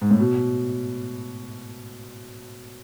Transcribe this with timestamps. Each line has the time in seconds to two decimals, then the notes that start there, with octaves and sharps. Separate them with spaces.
0.02 G#2
0.11 A2
0.20 B2